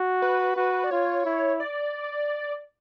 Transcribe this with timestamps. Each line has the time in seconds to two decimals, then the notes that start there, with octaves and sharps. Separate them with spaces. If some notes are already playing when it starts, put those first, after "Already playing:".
Already playing: F#4
0.22 B4
0.56 F#4
0.84 D5
0.91 F4 C#5
1.26 E4
1.60 D5